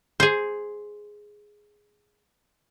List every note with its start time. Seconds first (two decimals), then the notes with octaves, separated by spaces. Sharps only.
0.20 G#4 C5